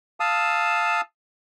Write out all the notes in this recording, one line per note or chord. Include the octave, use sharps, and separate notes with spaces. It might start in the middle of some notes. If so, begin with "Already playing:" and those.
F5 A5 D#6 E6